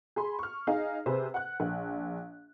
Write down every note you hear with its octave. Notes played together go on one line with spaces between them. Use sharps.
G#4 B5 C6
C#6 F6
D#4 G#4 F5
C3 G#4 B4 C5
F#5 F#6
A#1